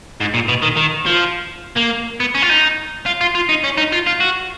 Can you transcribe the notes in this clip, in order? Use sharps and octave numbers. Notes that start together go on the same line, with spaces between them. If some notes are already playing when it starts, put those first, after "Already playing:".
G#2
A#2
B2
D#3
D#3
F3
A#3
B3
C#4
F4
D#4
F4
F4
F4
D#4
C#4
D#4
F4
F4
F#4